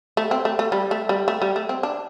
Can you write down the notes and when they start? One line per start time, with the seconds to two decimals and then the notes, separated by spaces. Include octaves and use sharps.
0.17 A3
0.31 C4
0.45 A3
0.59 A3
0.72 G3
0.91 A3
1.09 G3
1.28 A3
1.42 G3
1.56 A3
1.69 C4
1.83 D4